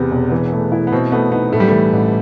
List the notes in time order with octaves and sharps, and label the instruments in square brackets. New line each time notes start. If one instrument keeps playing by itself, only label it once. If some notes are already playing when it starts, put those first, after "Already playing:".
Already playing: [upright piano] E2 C3 [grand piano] B3
[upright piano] E1
E3
A3
E4
[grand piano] B3
[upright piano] B2 [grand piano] C4
[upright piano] A3 [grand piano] B3
[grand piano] B3 [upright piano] D#4
[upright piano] A2 [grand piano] A3
[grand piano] G3
[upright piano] E3 [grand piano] A3
[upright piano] A1